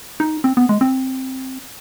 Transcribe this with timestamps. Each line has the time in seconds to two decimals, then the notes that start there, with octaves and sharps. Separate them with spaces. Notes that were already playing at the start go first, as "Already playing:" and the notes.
0.20 D#4
0.44 C4
0.57 B3
0.69 G#3
0.81 C4